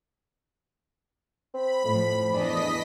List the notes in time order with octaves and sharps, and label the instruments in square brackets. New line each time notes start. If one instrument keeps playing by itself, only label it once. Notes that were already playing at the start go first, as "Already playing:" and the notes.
[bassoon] C4 [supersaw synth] B5
[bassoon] F2 [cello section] A2 F3
[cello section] E2 E3 D4 [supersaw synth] D#5 B6